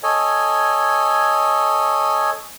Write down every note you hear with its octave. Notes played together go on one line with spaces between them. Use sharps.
A4 C#5 D#5 G#5